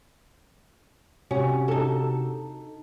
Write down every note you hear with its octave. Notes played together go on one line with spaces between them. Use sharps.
C3 C#4 F#4 G4
D#4 A4